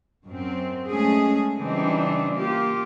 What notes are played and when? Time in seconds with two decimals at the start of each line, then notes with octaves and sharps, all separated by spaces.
0.27 F#2 C4
0.90 G#3 A3 C#4 G#4
1.58 C#3 E3 G3 C4 D4 D#4
2.35 A#3 F4 G4